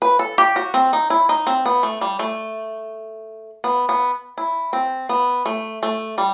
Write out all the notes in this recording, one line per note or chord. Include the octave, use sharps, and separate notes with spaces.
B4
A4
G4
F#4
C4
D#4
E4
D#4
C4
B3
A3
G3
A3
B3
B3
E4
C4
B3
A3
A3
G3